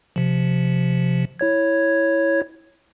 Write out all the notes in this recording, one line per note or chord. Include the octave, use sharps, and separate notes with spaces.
C3 F3
E4 C#5 G#6